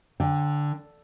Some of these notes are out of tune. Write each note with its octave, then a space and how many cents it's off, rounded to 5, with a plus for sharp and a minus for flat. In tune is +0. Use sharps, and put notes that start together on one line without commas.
D3 +0 G5 +25